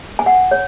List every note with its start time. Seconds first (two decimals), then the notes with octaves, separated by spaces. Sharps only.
0.19 G#5
0.26 F#5
0.51 C#5